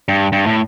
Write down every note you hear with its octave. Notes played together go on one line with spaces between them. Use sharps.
G2
G2
A2